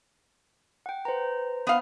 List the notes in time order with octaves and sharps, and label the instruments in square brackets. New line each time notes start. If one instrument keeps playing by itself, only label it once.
[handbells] F#5 G5
[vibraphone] B4 [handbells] C5 A#5
[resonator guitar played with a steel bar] B3 F5